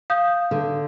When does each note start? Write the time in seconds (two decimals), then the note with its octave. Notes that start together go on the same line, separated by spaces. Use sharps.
0.10 F5 D#6 G6
0.51 D3